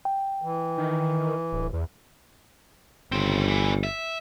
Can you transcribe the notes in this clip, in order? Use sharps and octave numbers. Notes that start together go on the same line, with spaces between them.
G5
E3
D#3
D1
E2
G1 C#3 C4
D3 E3
E5